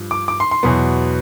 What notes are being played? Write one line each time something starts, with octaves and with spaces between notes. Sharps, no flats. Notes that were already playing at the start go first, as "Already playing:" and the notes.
Already playing: G2 F3
D6
D6
C6
C6
E2 B2 F#3 B3